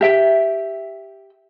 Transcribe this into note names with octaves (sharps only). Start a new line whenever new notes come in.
G4 E5 G5